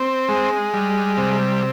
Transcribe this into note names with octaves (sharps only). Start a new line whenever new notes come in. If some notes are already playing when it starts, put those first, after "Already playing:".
Already playing: C4
G#3
G3
C3